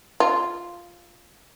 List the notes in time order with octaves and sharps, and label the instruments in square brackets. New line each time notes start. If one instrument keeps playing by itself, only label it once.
[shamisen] F4